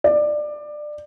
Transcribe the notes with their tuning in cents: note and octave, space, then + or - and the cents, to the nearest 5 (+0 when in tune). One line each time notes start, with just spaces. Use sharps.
D5 +20